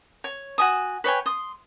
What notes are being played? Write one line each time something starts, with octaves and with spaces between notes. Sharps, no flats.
C#5
F#4 G#5 D#6
B4 C#5 G5 G#5
C6 D#6